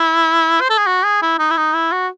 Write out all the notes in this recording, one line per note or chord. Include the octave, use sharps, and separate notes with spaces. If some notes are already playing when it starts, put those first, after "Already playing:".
Already playing: E4
C5
A4
G#4
F#4
G#4
E4
D#4
E4
D#4
E4
F#4